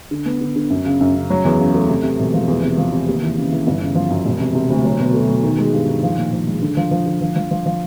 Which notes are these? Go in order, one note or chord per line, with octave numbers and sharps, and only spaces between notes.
D3
B3
D3
D3
F#2
C#3
F#2
C#3
F#3
E2
C#3
A3
C3
C3
E1
F3
E2
C3
F3
C3
D#2
E3
C#3
E3
G1
C#3
F3
F#2
E1
C3
C3
D2
F#3
B2
A3
B2
D#3
G#3
G2
D#3
F3
A#2
F3
G#3
D3
F3
F3
D3
F3
F3
F3
F3